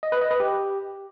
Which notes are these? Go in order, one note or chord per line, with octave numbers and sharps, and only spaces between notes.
D#5
B4
D#5
B4
G4